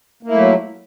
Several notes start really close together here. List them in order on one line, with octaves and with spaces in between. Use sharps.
A#3 E4 A3 F#3